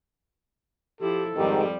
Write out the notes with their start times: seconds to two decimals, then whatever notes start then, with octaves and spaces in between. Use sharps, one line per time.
1.01 F3 E4 G4 A4
1.37 F2 G#2 D#3 G3 G4